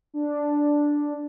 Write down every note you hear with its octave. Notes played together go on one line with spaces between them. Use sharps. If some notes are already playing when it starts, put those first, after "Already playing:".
D4